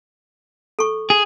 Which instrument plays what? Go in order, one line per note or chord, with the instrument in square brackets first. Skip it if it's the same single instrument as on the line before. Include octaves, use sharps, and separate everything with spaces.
[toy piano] A4 C#6
[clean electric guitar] G#4